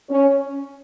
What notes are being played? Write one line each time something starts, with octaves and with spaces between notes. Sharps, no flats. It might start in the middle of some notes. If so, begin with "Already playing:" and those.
C#4